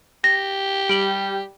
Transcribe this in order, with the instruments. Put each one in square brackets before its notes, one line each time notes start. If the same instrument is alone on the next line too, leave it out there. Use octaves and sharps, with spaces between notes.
[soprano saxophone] G4 [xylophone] A#6
[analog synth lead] G3 [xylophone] D7 F#7